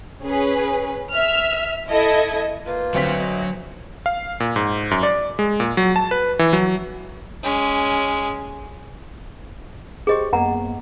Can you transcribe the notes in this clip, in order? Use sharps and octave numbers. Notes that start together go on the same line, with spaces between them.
C#4 G#4 B4
E5 F6
E4 A4 D#5 G#6
A#3 F4 B4
D2 F#3 C4 B6
D#5
F5
A#2
G#2
F#2
D5
G#3
A#2
F#3
A5
B4
E3
F#3
G#3 C#4
G4 G#4 C5 D#5 C#6
F#2 A#3 B3 F#5 A#5